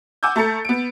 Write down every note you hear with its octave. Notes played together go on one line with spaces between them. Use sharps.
F#5 G#5 D6 E6 G6
A3 A5 A#5 A6 C#7
B3 D7